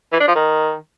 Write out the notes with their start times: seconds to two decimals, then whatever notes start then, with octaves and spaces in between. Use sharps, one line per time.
0.12 E3
0.20 D4
0.28 F3
0.35 D#3